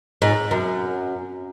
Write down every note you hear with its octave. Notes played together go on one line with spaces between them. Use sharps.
G#2
F#2